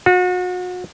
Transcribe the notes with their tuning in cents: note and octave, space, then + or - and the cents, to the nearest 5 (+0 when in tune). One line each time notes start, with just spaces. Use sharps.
F#4 -35